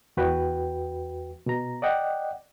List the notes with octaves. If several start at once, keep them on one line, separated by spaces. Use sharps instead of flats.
E2 F#4 B4 G5
B2 A#5
D5 D#5 F#5 G5